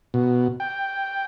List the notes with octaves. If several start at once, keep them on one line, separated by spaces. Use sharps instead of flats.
B2
G5